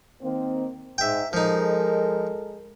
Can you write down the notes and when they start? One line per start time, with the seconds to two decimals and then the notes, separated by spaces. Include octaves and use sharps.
0.22 D#3 A#3 C4
0.98 G#2 E5 G5
1.33 F3 G#3 D#4 A4 A#4